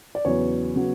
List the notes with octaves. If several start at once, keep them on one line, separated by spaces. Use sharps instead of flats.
D5
E2 C#3 F#3 B3 C#5
C#3 F#3 B3